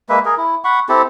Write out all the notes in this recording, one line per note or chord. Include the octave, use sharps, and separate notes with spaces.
G#3 A#3 B4 E5
G#4 A#4
E4
F#5 B5 C#6
C4 E4 G4 A4